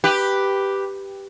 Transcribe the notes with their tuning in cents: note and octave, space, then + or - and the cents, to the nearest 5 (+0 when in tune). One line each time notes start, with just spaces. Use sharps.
G4 +0 B4 +0